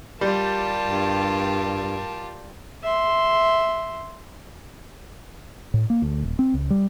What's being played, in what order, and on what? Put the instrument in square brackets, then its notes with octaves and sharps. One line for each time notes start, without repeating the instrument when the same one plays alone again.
[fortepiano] G3 [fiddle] F4 G4 [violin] A#4 A5
[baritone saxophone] G2
[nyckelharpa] E5 C6
[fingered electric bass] A2
A#3
D2
D#1
C4
C#2
G3